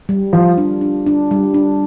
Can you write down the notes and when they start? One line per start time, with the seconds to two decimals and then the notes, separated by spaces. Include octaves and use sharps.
0.09 G3
0.33 F3 F4
0.57 D4
0.81 D4
1.06 D4
1.31 G3
1.54 D4